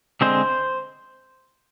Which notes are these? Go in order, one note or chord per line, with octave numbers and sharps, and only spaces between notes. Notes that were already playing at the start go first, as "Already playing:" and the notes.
D3 G#3 C4 C5